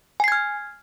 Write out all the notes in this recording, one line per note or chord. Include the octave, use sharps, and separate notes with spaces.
G#5 F6 G#6 C7